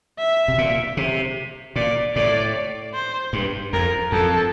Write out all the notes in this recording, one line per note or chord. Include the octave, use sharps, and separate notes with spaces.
E5
C3
A#2
C3
A#2 D5
A2 D5
C5
G2
F2 A#4
F2 A4